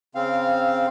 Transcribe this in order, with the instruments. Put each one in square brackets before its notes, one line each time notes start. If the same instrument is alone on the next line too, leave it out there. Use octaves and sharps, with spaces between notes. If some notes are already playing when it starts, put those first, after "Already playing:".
[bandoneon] C#3 C4 F5